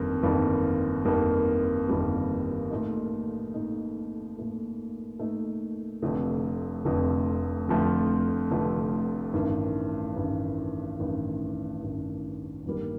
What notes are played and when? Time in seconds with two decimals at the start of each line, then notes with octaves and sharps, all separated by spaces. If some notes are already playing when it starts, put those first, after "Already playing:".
Already playing: G1 F2 D#3 G3 A#3
0.23 G1 F2 D#3 G3 A#3
1.05 G1 F2 D#3 G3 A#3
1.88 G1 F2 D#3 G3 A#3
2.71 A#2 A3 D#4
3.54 A#2 A3 D#4
4.37 A#2 A3 D#4
5.19 A#2 A3 D#4
6.02 F1 F2 D3 F3 A3
6.85 F1 F2 D3 F3 A3
7.68 F1 F2 D3 F3 A3
8.51 F1 F2 D3 F3 A3
9.34 A1 G2 D#3
10.16 A1 G2 D#3
10.99 A1 G2 D#3
11.82 A1 G2 D#3
12.65 G1 G2 D#3 G3 A#3